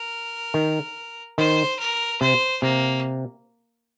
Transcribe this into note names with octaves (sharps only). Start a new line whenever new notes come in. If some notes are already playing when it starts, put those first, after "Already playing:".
Already playing: A#4
D#3
D#3 C5
A#4
C3 C5
C3 A#3